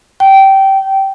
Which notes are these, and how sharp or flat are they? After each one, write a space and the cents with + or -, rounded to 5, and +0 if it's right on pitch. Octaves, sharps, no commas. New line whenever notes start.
G5 -15